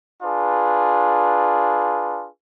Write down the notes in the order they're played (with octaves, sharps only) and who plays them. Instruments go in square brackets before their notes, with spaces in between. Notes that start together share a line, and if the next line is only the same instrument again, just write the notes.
[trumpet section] D4 F4 G#4 B4